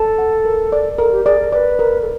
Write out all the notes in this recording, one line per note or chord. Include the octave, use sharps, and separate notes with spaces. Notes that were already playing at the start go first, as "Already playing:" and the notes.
Already playing: A4 A5
F#5
A#4
D5
A4 A#4
G4
G#4 D5
A#4
B4 D5
A#4
A4